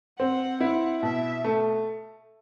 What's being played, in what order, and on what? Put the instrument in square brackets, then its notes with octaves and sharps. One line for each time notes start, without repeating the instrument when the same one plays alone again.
[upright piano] C4 [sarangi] F#5
[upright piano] E4 [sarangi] F#5
[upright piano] B2 [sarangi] E5
[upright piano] A3